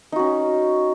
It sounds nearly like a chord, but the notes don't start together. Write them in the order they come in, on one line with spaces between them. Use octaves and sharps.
D#4 F#4 C#4